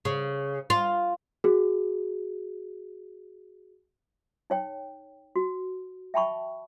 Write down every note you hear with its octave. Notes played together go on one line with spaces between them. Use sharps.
C#3
F4
F#4 G#4
D#4 C#5 G5
F#4
E5 G5 A5 B5 C#6